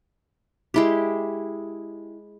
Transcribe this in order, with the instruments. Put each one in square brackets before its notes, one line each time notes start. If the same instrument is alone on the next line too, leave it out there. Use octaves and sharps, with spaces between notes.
[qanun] G#3 E4 G4